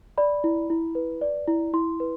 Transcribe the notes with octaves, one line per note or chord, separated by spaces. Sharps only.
D5 B5
E4
E4
B4
D5
E4
E4 C6
B4